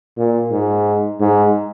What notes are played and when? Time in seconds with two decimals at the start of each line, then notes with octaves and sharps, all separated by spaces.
0.17 A#2
0.51 G#2
1.20 G#2